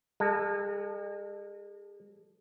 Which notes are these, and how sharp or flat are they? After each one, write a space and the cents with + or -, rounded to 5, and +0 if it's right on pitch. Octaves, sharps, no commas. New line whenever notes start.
G#3 -45 A4 +0